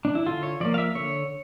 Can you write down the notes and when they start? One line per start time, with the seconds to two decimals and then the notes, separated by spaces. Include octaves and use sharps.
0.05 D4
0.15 E4
0.26 D3 F4
0.43 C#5
0.60 F3 A#3 D5
0.74 F5
0.78 E5
0.95 D3 C#5